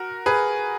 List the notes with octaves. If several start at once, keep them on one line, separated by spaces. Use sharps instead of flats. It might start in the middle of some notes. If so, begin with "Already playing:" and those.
Already playing: F#4 A#4
G#4 B4